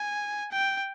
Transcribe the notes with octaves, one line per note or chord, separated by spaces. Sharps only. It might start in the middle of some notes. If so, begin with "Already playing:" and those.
Already playing: G#5
G5